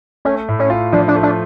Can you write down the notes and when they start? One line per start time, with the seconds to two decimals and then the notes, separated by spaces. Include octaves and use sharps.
0.25 A3 C#4
0.48 A2
0.59 C#4
0.70 F4
0.93 F3 D4
1.08 D4
1.15 A3
1.23 D4